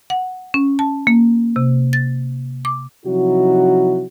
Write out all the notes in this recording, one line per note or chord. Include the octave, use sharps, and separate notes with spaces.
F#5
C#4
A5
A#3
C3
A6
D6
C3 F3 F#3 D#4 E4 F#4